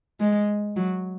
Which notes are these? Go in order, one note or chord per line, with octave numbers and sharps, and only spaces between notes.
G#3
F#3